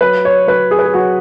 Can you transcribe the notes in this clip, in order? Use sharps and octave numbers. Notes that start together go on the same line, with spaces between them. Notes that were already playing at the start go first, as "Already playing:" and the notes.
F#3 B4
C#5
F#3 B4
G#4
B4
G#4
F#3 F#4